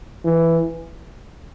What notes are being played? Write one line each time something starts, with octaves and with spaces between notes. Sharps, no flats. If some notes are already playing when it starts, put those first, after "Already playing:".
E3